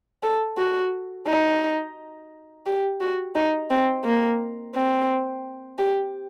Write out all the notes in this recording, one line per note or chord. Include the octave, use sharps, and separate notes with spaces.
A4
F#4
D#4
G4
F#4
D#4
C4
A#3
C4
G4